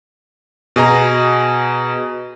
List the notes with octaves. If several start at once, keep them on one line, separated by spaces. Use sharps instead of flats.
B2 G#4 D#5 A#5